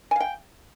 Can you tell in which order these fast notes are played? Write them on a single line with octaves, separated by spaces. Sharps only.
G#5 F5 G5